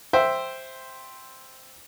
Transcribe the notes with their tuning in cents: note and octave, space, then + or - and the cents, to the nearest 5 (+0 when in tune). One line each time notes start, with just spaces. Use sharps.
C5 +0 E5 +0 G5 +0